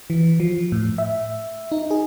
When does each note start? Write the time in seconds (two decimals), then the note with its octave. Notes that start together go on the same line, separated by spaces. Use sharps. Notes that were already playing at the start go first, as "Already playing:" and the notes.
0.10 E3
0.40 F3
0.72 A2
0.98 E5
1.72 D#4
1.91 G#4